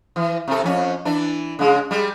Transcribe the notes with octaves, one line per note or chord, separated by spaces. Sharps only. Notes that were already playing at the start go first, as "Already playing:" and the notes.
E3
C3 A4
F2 C#4
E3 D4
C#3 G#3
G3 G#3